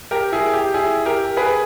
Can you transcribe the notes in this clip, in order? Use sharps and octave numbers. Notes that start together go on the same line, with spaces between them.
G4 A#4
E4 G#4
G4
E4 G#4
G4 A#4
G#4 B4